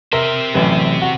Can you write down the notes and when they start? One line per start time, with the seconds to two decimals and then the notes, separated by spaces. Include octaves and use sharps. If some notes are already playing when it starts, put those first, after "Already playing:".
0.13 C3 A#4 C5 E5
0.54 A1 F#2 B4
1.02 F#4